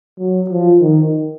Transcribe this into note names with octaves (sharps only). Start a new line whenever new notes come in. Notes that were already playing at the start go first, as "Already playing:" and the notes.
F#3
F3
D#3